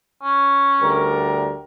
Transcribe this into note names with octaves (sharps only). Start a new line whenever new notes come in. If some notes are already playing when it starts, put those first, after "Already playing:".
C#4
D2 G3 A#4